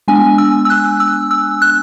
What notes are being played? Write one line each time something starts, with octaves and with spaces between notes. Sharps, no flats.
G#3 B3 D4 G#5
E6
E6
F#6
E6
E6
F#6